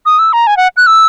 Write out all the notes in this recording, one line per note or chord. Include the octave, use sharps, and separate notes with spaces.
D#6
E6
A#5
G#5
F#5
F#6
E6